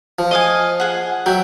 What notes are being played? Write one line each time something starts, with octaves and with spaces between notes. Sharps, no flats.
F3
D#5 F5 G#5
G#4 F#5
F#3 E5 G5